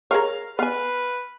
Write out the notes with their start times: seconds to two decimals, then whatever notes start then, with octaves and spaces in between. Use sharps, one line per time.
0.11 G#4 A#4 C#5 F5 A#5
0.59 B3 B4 F5 G#5